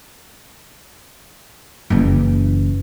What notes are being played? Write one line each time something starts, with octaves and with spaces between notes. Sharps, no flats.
F#1 E3